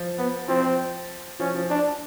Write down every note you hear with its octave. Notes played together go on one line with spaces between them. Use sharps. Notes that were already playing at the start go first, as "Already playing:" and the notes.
Already playing: F3
B3
F3 C4
F3 C#4
F3
D4